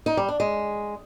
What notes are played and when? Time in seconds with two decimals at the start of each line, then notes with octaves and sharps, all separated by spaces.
0.06 D#4
0.17 G3
0.29 D4
0.40 G#3